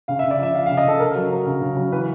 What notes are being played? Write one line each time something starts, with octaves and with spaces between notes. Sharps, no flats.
C#3 F5
E5
C#3
D5
F3 E5
F3 F5
F5
C#3
D#5
C#3 A4
C#3 A#4
F#3
F#3
C#3
C#3
F#3
E3 B4